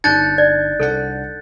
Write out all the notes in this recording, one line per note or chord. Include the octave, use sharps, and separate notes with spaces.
G1 D4 D#4 F#6 G6 A6 C#7
D5
C2 D4 A4 F#5